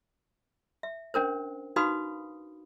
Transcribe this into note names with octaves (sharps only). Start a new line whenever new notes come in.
E5
C#4 D4 A#4 C5
D#4 F#4 B4 F5 B5 D#6